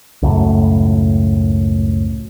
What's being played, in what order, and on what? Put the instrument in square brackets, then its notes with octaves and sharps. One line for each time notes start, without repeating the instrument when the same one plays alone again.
[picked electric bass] C#2 F#2 A2